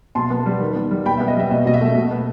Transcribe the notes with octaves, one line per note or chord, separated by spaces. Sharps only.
B2 A5 C6
B3
G3
D#3
B3
G3
B2 G5 B5
E5
B3
D#5
G3 E5
B2 D#5
B2 D#5
E5
A3
B2
B3